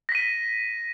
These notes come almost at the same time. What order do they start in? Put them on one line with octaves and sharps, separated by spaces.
A#6 B6 D#7